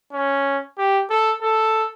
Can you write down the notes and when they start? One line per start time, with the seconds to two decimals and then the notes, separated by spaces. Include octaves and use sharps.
0.12 C#4
0.78 G4
1.10 A4
1.42 A4